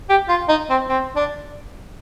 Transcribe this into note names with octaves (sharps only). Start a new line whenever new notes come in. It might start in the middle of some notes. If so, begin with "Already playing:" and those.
G4
F4
D#4
C4
C4
D4